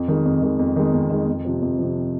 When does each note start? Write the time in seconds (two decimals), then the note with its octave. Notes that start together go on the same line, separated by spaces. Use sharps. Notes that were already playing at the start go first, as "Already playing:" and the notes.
Already playing: F2
0.08 D#3 G#3
0.25 F2
0.42 D#3 G#3
0.59 F2
0.76 D#3 G#3
0.93 F2
1.10 D#3 G#3
1.28 F2
1.45 C3 F3
1.62 F2
1.78 C3 F3